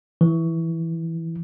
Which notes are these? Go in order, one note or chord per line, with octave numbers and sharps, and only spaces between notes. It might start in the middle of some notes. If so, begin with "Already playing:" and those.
E3